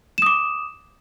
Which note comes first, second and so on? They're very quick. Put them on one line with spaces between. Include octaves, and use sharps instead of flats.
E7 D#6 D6